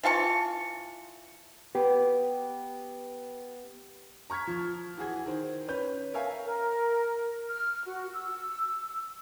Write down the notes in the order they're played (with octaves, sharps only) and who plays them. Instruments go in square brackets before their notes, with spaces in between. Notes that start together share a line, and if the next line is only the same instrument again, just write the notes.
[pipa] E3 F4 A5 C#6
[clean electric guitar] B3 B4 [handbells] G4 G5
[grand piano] A#5 C#6 F6 G#6 B6
F3
E3 F#4 G#4 G#6
D#3 C5
C#4 B4 G6
A#4 C#5 E5 F5 G#5
[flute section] A#4
F6
F#4
E6